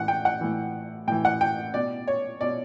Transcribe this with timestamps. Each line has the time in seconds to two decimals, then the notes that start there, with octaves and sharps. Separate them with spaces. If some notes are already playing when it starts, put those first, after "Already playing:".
Already playing: A2 E3 F#5
0.08 G5
0.25 F#5
0.41 A2 E3
1.08 A2 E3 G5
1.25 F#5
1.41 G5
1.74 B2 D5
2.07 C#5
2.41 B2 D5